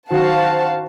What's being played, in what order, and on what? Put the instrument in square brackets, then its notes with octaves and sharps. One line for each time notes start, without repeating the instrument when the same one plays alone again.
[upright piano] D#3 F#3 [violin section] F#4 C5 F5 A5